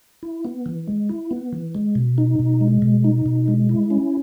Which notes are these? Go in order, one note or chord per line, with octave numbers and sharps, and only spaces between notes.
E4
B3
E3
G#3
E4
B3
E3
G#3
B2
D#4
B2
G#3
B2
D#4
B2
G#3
E4
C#4